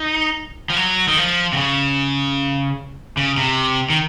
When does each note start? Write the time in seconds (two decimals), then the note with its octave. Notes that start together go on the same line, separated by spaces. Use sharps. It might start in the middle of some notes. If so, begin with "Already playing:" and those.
Already playing: D#4
0.70 F3
0.76 F#3
1.08 D#3
1.18 F3
1.53 C3
1.56 C#3
3.17 C#3
3.37 C3
3.90 D#3